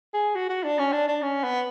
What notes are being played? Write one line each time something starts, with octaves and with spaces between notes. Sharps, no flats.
G#4
F#4
F#4
D4
C#4
D4
D4
C#4
B3